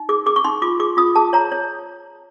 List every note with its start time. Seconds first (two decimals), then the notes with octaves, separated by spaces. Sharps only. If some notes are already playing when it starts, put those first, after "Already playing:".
Already playing: D#4
0.09 G#4 D6
0.26 G#4 D6
0.36 C#6
0.44 D#4 C6
0.62 F4 D6
0.80 G#4 D6
0.97 F4 D#6
1.16 G#4 A5
1.33 C#5 A#5
1.52 C#5